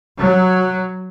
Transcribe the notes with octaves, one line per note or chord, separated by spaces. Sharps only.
F#3